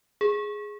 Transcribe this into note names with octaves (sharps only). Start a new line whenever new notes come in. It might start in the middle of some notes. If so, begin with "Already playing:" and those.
G#4